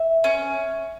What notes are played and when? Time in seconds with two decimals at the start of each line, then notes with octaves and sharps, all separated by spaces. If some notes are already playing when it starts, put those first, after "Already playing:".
Already playing: E5
0.24 C#4